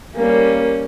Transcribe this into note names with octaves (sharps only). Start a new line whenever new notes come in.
G3 A#3 C#4